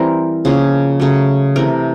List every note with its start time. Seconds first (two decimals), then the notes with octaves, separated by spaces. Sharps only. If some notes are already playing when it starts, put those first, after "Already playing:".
Already playing: E3 G3 C4 A#4
0.45 C#3 F3 A#3 C#4
1.00 C#3 F#3 A3
1.56 C3 E3 A3 A#4